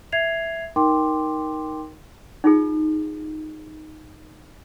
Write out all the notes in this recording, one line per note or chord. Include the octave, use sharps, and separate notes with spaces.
E5 G#6 C7 F7
D#4 A#4 G5 C6 D6
D#4 F4 G#4